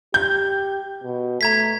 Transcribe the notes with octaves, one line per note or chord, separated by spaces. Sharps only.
G4 G6
B2
A3 A#5 G#6 B6